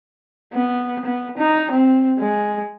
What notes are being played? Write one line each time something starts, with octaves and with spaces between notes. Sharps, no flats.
B3
B3
D#4
C4
G#3